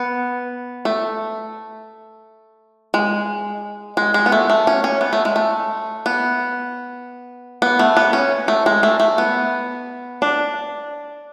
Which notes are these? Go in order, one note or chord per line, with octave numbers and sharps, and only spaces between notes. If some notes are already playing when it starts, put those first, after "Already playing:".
Already playing: B3
A3
G#3
G#3
G#3
B3
A3
A3
C#4
C#4
B3
A3
G#3
A3
B3
B3
A3
B3
C#4
A3
G#3
A3
A3
B3
D4